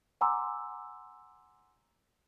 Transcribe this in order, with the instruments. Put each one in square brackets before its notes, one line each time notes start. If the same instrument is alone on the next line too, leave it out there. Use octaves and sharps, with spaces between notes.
[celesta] F#5 G#5 A#5 C6 D6 E6